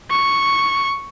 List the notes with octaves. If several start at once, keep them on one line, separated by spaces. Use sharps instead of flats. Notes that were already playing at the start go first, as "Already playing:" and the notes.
C#6